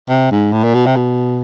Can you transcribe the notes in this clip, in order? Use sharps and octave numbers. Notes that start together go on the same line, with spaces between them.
C3
G#2
A2
A#2
B2
C3
B2